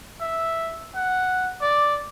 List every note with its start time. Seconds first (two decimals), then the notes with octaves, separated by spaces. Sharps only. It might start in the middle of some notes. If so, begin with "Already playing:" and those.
0.21 E5
0.96 F#5
1.62 D5